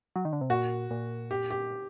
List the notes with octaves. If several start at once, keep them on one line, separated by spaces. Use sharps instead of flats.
F#3
D#3
D3
C3
A#2 F#4
A#2
G4
G4